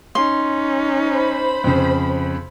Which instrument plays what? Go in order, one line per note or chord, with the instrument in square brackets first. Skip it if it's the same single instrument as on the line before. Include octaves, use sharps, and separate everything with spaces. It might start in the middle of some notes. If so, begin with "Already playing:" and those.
[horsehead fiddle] C#4 D#4 [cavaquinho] C6
[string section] C5 B5
[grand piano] F2 C#3